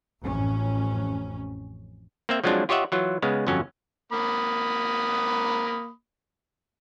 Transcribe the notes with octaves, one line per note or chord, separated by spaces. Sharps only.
A1 F2 C#4
A#3 C4 E5
F3 F#3 G#3 C4 D4 F4
F4 G4 C#5 D#5 E5 F#5
E3 F#3 F4
C#3 G#3 B3 F5
G1 F2 F#3 C#4
A#3 B5 D#6